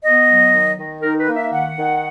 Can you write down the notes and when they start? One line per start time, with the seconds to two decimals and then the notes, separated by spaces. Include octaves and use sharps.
0.03 B3 D#5
0.28 F#3
0.53 D#3
0.78 D#3
1.02 D#4 A#4
1.19 B4
1.27 A#3
1.36 E5
1.51 D#3 F#5
1.77 D#3